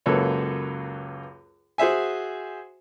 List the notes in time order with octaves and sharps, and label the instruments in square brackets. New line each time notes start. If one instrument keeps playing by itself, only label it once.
[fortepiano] C#2 F#2 A#3 A4 B4 C#5
F#4 G#4 C5 E5 G#5